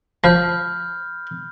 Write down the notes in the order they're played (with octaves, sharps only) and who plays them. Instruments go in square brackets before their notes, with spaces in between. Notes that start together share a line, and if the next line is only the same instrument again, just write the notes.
[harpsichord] F3 [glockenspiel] B5 F6 G6